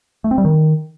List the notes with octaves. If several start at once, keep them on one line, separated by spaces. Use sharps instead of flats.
A3
C4
G3
D#3